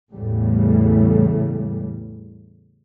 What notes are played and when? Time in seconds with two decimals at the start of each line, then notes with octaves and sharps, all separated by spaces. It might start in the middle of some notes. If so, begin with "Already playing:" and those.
0.12 E2 A2 C#3 G3 A3